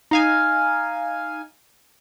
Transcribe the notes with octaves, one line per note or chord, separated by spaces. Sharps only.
D#4 F5 G#5